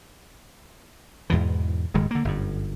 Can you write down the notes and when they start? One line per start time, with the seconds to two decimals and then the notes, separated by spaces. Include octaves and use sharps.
1.30 E2 G#2 B2 E3
1.94 D#1 G#2 D#3 G#3
2.11 D3 A#3
2.25 G1 F#2